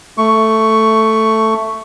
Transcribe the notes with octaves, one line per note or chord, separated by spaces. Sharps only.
A3 C#6